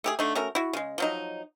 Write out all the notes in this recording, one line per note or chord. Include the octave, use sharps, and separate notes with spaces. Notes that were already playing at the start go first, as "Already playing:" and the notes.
A3 G4 G#4
D3 A3 D#4
A3 C#4 F#4 A#4
E4 F#4
C#3 G#3
F3 F#3 D#4